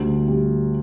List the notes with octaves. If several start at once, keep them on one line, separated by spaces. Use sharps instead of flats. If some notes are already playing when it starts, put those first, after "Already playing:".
Already playing: D2 G3
G3